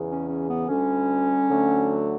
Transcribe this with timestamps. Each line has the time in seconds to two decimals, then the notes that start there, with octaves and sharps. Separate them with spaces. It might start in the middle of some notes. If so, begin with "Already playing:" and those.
Already playing: E2 C#3 E3
0.09 C#4
0.28 C#4
0.48 B3
0.68 D2 D3 G3 C#4
1.47 D2 D3 F#3 A3